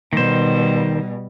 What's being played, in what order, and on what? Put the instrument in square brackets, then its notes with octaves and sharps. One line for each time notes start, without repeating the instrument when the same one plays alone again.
[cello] B2 G3 [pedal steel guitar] D#3 C5